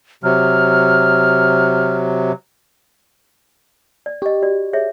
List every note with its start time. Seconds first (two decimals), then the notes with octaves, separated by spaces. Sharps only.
0.23 C3 F#3 F6
4.06 D5
4.22 G4 D#5 C#6
4.42 F#4 D5
4.73 G#4 C#5 E5